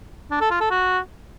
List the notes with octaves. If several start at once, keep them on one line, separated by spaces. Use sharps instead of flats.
D4
A4
F4
A4
F#4